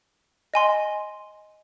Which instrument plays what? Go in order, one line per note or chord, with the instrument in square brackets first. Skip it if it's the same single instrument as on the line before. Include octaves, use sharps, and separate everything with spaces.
[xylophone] D#5 G#5 C6